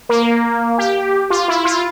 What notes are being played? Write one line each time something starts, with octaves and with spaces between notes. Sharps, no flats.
A#3
G4
F4
E4
F4